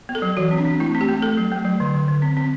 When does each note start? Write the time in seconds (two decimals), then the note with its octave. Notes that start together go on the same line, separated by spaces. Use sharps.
0.09 B3
0.15 A4
0.22 F#3
0.37 E3 F#4
0.51 C4
0.58 D4
0.65 C4
0.80 A3 E4
0.95 C4
1.01 G4
1.08 A3
1.22 A3 A4
1.37 F#3
1.52 A3
1.65 F#3
1.80 D3
1.94 D3
2.08 D3
2.22 C4
2.37 C4